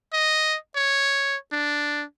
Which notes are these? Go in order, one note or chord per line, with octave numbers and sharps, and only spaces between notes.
D#5
C#5
D4